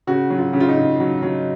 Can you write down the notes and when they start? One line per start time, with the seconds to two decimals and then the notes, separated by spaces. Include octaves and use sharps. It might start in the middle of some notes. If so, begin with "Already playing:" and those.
0.07 C#3 F#4
0.30 F#3
0.38 F4
0.53 C#3
0.60 F4
0.69 D#4
0.76 C#3
1.00 F#3
1.22 F#3